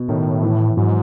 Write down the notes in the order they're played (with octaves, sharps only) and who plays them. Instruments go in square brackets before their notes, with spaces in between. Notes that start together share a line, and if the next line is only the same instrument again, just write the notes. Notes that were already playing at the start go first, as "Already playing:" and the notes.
Already playing: [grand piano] B2
[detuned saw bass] A2 [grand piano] D#3
[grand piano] E3
[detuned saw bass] G#2 [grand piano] F#3